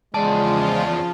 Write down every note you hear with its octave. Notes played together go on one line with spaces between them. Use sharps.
E2 C#3 F3 G#3 F4 D5 A5